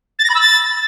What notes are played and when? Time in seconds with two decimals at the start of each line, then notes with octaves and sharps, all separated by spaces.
0.19 A6
0.24 A#6
0.30 B5
0.35 E6
0.40 A6